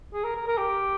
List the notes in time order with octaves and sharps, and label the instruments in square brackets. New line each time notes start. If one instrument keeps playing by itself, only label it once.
[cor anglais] G#4
A#4
A#4
A#4
G4